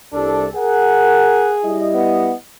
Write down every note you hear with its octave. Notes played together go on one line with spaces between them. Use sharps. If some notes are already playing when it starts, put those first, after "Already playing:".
C2 D4 A4
G#4 A#4 F#5
G3 E4 D#5
B3